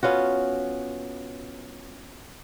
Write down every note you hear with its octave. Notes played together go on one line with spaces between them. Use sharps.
B3 C#4 F4 F#4